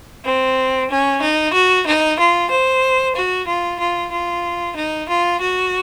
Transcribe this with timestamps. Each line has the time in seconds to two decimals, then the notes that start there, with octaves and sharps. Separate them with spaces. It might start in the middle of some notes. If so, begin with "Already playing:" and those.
0.24 C4
0.89 C#4
1.21 D#4
1.53 F#4
1.86 D#4
2.18 F4
2.49 C5
3.15 F#4
3.47 F4
3.79 F4
4.11 F4
4.76 D#4
5.08 F4
5.40 F#4